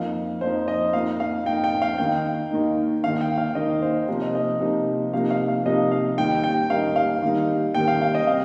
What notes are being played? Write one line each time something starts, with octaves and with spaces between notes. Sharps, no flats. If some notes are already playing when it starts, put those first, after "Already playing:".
Already playing: F2 F3 A#3 D#4 F5
F2 F3 A#3 D#4 C5
D#5
F2 F3 A#3 D#4 F5
F5
F2 F3 A#3 D#4 G5
G5
F5
D#2 D#3 A#3 D#4 G5
D#2 D#3 A#3 D#4
D#2 D#3 A#3 D#4 F5
G5
F5
D#2 D#3 A#3 D#4 D#5
C5
C3 F3 A#3 D#4 C5
D#5
D#5
C3 F3 A#3 D#4
C3 F3 A#3 D#4 F5
F5
F5
C3 F3 A#3 D#4 D#5
F5
D#2 D#3 G3 A#3 D#4 G5
G5
D#2 D#3 G3 A#3 D#4 F5
F5
D#2 D#3 G3 A#3 D#4
D#2 D#3 G3 A#3 D#4 G5
F5
F5
D#5
C3 G3 C4 F5